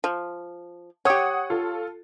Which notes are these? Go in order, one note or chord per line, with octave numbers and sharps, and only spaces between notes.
F3
G4 C#5 F#5 D#6
F4 A4